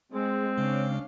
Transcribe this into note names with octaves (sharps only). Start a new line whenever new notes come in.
G#3 C4
C#3 G#3 C#4 D4 F5